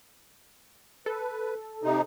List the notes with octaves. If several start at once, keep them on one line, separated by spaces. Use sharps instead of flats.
A4 B4
C3 D#4